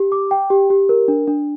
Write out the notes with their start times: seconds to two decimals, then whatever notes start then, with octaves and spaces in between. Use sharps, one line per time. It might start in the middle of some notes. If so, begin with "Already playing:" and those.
Already playing: G4
0.12 D6
0.31 G5
0.50 G4
0.70 G4
0.89 A#4
1.08 D4
1.28 D4